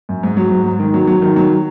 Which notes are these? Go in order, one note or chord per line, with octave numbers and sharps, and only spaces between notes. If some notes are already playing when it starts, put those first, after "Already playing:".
F#2
G#2
F#3
G#2
G#2
D#3
F#3
F#3
D#3
F#3